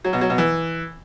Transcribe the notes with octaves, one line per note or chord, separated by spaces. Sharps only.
F#3
B2
F#3
B2
E3